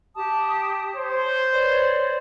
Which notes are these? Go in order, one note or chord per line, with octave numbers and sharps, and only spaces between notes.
G4 A5 D#6
C5 C#5
B4 C#5 D5